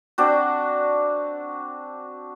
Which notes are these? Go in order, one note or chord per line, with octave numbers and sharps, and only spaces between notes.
C4 D4 F#4